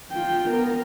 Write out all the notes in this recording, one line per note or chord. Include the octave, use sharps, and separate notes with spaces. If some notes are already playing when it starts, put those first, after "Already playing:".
F4 G5
B3 A#4